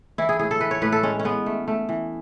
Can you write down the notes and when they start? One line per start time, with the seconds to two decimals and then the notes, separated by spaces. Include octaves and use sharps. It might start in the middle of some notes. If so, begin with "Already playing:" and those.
0.18 E3 E4
0.29 G#4
0.39 A2 G#4
0.51 A4
0.61 E3 B4
0.71 C#5
0.82 A2 B4
0.92 A4
1.03 G#3 C#4
1.19 C#4
1.25 G#3 B3
1.46 A3
1.68 A3
1.89 E3